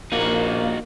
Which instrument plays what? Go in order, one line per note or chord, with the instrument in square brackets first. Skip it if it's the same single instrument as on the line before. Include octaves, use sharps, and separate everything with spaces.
[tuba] A#1 [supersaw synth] A#3 [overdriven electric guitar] D#4 F#4